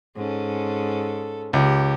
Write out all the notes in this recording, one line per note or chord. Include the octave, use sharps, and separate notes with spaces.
G#2 C#4 A4
C#2 G4